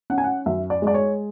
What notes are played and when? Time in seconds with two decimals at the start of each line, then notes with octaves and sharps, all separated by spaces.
0.10 C#4 F#5
0.18 G#5
0.24 F#5
0.46 F#2 E5
0.70 D5
0.82 G#3 D5
0.94 C#5